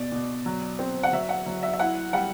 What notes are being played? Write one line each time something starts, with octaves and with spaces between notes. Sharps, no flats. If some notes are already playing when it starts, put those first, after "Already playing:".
Already playing: B2 D5
B2
F#3
C4
F#5
F#3 E5
F#5
F#3
E5
E5
E4 F#5
G3 F#5